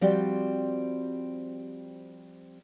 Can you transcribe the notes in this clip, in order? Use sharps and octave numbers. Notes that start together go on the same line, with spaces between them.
F3 G3 C4 F#4 G4 D5